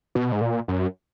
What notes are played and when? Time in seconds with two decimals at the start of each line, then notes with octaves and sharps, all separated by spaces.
0.15 B2
0.32 G#2
0.41 A#2
0.68 F#2